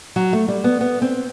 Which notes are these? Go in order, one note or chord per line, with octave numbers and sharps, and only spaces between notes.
F#3
A3
G3
B3
B3
C4